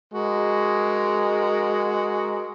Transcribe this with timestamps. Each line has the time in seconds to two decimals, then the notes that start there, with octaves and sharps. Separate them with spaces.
0.14 G#3 F#4 A#4